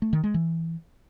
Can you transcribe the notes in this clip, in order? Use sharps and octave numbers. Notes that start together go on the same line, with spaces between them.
A3
D#3
G#3
E3